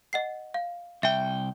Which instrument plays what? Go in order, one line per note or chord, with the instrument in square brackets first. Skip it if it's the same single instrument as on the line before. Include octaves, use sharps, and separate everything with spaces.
[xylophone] D#5 F#5 C7
F5
[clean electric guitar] C2 G5 [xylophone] E5